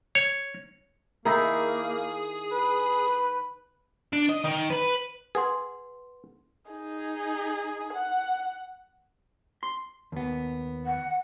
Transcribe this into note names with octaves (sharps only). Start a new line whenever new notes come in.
C#5
D#3 A#3 D#4 E4 G#4
B4
D4
D#5
D#3
B4
G#4 B4 F#5 C6
D#4 G#4
F#5
C6
D#2 B3
F#5